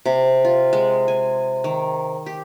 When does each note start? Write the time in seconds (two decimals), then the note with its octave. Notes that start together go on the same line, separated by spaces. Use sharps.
0.06 C3
0.45 F4
0.73 G#3
1.08 G#5
1.64 D#3
2.26 G4